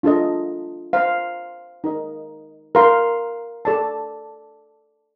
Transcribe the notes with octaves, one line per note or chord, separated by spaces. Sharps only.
D4 F4 A4 D#5
C5 F5 A#5
D#4 A#4 D#5
A#4 F5 C6
A4 D5 A5